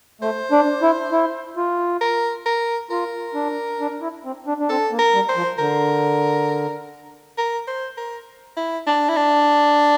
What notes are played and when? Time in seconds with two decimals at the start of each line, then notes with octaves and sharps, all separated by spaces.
0.21 A3 C5
0.52 D4
0.82 E4
1.12 E4
1.57 F4
2.01 A#4
2.46 A#4
2.90 F4 A#4
3.35 D4
3.80 D4
4.02 E4
4.25 C4
4.47 D4
4.60 D4
4.69 C4 A4
4.92 A#3
4.99 A#4
5.14 G3
5.29 C5
5.36 F3
5.59 D3 A#4
7.38 A#4
7.68 C5
7.97 A#4
8.57 E4
8.87 D4
9.09 E4
9.17 D4